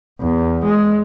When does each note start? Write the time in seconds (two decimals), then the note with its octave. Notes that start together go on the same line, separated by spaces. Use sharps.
0.21 E2
0.65 G#3